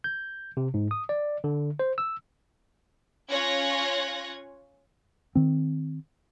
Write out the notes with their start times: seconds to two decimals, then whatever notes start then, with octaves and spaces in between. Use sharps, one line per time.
0.04 G6
0.57 C3
0.74 G#2
0.91 D#6
1.09 D5
1.44 D3
1.79 C5
1.98 E6
3.29 C#4 F4 C#5 F#6 G#6 A#6
5.35 D#3 C4